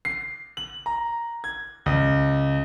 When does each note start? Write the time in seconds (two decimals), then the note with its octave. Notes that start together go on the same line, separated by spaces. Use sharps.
0.05 C7
0.57 F#7
0.86 A#5
1.44 G#6
1.86 C#2